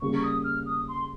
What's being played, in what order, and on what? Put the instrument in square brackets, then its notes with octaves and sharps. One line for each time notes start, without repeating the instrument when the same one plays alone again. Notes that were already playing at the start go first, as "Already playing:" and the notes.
[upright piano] C#3 G3 A#3 C#4 [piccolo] C#6
[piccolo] D#6
F6
D#6
C6